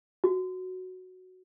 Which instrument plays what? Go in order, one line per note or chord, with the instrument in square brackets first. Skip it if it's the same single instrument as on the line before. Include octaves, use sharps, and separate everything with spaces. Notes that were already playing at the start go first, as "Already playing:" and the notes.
[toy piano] F#4